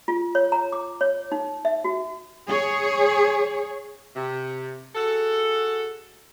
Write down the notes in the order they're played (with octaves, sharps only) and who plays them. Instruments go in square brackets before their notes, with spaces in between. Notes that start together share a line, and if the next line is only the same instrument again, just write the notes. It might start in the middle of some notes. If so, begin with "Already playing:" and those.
[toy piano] F4
C#5
A#5
D6
C#5
D#4
E5
F#4
[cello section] G#4 C#5
[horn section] C3
F#4 G#4 A4